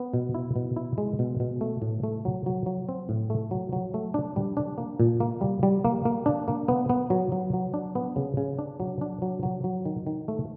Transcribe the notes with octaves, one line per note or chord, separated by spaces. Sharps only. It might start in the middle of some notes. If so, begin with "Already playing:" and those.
Already playing: B3
B2
E4
B2
E4
G#3
B2
B2
A3
A2
A3
F#3
F#3
F#3
C4
A2
A3
F#3
F#3
A3
D4
G3
D4
A#3
A#2
A#3
G3
G3
A#3
A#3
D4
A#3
B3
B3
F#3
F#3
F#3
D4
B3
C#3
C#3
D4
F#3
D4
F#3
F#3
F#3
D#3
D#3
A3